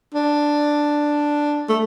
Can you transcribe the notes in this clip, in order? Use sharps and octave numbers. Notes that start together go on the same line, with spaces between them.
D4
A3